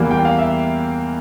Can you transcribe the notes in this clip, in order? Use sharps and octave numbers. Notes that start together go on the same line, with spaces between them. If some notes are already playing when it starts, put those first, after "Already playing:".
Already playing: E2 E3 G3 A#3 F5
G5
F5
E5